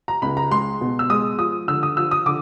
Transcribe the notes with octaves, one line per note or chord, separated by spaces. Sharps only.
A#5
C#2 B5
A#5
G#3 C6
B2
E6
G#3 D#6
F3 D#6
D3 E6
D#6
F3 E6
D#6
D3 D6